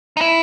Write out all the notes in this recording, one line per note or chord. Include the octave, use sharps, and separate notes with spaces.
D#4
E4